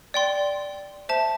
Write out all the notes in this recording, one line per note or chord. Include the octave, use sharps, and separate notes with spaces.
D5 G5 C6
C5 E5 A5